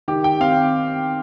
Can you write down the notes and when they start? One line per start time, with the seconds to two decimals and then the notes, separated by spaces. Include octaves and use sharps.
0.08 D#3 G4
0.24 G5
0.40 C4 F5